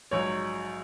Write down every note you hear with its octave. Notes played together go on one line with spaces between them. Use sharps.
A#1 G#2 F#3 C#5